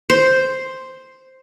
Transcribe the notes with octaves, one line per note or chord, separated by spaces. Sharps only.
C5